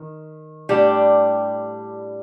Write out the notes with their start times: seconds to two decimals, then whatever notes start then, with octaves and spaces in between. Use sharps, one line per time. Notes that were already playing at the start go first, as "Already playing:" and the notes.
Already playing: D#3
0.69 A2 G3 D4 G4